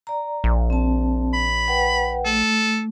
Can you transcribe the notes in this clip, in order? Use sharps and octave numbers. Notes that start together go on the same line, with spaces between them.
D5 A#5
A#1
C4 A5
B5
B4 F#5 G5
A3 A4